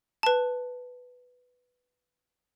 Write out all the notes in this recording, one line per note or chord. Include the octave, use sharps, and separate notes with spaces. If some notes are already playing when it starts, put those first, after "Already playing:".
B4 A5